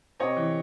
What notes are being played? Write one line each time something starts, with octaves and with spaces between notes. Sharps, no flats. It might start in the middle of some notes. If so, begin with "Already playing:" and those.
C3 C#5 D#5
E3